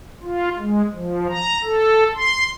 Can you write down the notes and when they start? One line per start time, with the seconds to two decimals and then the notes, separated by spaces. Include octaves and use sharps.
0.23 F4
0.58 G#3
0.94 F3
1.29 A#5
1.64 A4
2.15 C6